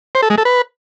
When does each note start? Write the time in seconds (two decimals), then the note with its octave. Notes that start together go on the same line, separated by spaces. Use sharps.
0.15 C5
0.22 A4
0.30 G#3
0.38 A4
0.45 B4